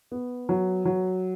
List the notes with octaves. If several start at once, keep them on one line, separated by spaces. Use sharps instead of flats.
B3
F#3
F#3